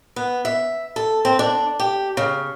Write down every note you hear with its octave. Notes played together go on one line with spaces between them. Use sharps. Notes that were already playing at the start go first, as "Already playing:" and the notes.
B3
E5
A4
C4
D4
G4
C#3